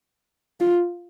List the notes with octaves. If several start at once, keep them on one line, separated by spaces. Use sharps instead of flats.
F4